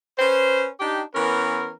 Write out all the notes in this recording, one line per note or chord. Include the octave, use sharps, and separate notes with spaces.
C#4 B4 C5
D4 D#4 G4
E3 B3 C#4 A#4